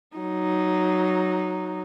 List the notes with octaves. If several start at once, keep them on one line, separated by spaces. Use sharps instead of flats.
F#3 D#4